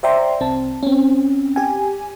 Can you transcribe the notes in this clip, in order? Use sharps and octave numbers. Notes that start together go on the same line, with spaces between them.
C5 D5 E5 G5 A#5 C6
C2 C4 A5
C4 C#4
G4 G#5